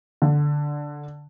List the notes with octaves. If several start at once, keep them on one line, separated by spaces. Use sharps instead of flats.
D3